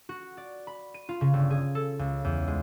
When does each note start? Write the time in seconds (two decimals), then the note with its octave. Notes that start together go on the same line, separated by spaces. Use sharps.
0.09 F#4
0.37 D5
0.67 B5
0.94 D#7
1.09 F4
1.21 C#3
1.33 G1
1.50 G#4
1.75 A4
1.99 C#2
2.24 E2
2.48 G#3